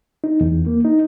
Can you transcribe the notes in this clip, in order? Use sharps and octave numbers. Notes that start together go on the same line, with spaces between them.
D#4
E2
A#3
D#4